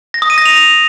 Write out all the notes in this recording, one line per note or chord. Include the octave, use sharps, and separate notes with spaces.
A#6
D#6
D#7
A#6
F7